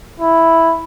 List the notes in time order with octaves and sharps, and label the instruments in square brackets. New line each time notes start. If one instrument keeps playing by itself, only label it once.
[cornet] E4